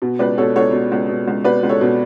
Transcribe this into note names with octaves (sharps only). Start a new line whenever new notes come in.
B2
C#2 B4 D5
B2 A4 C#5
C#2 A4 C#5
B2
C#2
B2
C#2
B2 B4 D5
C#2
A4 C#5
B2